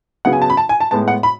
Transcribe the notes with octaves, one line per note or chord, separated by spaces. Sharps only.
C#3 F#3 B3 F#5
G#5
A5
B5
A5
G#5
A5
A2 G#3 B3 A5
F#5
B5